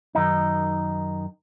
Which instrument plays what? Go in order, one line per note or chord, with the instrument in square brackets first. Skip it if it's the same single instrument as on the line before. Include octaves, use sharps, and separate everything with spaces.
[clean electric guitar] F#2 D#3 D#4